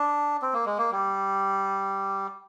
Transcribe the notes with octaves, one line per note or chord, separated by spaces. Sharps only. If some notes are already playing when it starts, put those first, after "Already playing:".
Already playing: D4
C4
A#3
G#3
A#3
G3